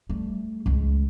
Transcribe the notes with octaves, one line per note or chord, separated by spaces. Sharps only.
G3 A3
C#2 G#3